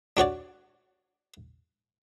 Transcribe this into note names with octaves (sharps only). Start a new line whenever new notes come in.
D4 F#4 C#5 D5